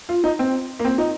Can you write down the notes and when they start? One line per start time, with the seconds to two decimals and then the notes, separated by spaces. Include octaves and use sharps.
0.09 F4
0.24 D#4
0.39 C4
0.79 A#3
0.85 C4
0.98 D#4